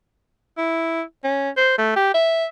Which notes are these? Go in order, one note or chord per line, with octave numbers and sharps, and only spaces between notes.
E4
C#4
C5
A3
G4
E5